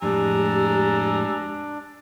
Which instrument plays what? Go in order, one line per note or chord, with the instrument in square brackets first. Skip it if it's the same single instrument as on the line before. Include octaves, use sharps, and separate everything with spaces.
[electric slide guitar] F2 A2 G#3 [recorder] D4 [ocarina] G4 [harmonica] G#5 A#5 E6